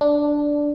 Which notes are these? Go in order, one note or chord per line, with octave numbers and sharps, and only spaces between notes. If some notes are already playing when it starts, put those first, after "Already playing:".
D4